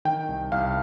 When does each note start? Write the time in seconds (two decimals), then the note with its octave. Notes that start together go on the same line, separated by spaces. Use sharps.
0.05 D#3 G5
0.29 C2
0.52 C2 F5